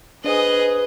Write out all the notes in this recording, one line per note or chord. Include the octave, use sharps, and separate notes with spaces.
D4 G#4 B4 C5 D#5 G#5